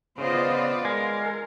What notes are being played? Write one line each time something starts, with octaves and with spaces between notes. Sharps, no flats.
C#3 B3 F4 C5 D5 D#5
G#3 A#4